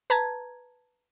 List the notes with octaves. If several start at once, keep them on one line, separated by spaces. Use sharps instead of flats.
B4 A5 A#5 G#6